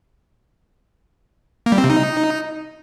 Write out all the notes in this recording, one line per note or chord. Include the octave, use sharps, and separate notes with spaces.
A#3
G3
C4
C3
D#4